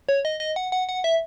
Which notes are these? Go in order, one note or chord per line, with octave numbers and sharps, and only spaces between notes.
C#5
D#5
D#5
F#5
F#5
F#5
E5